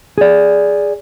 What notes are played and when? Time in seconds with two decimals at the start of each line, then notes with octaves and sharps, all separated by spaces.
0.18 G#4 D5